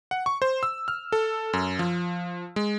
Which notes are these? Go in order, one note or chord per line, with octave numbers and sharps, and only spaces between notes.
F#5
C#6
C5
E6
F6
A4
F#2
F3
G#3